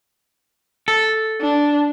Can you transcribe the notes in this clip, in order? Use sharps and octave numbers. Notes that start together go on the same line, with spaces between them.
A4
D4